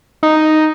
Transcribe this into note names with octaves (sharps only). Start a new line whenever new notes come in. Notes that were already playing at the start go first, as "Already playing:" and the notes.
D#4